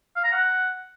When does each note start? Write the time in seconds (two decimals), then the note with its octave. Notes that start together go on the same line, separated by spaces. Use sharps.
0.16 F5
0.24 A#5
0.32 F#5